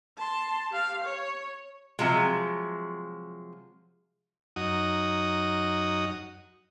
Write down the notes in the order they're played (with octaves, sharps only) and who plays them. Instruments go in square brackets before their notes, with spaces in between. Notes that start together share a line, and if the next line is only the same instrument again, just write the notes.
[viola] A5 C6
G4 F5
C#5
[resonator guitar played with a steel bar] C3 F3 F#3 G#3
[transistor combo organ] F#2 D#4 F#4 D#6